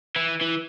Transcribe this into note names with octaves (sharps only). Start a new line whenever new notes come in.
E3
E3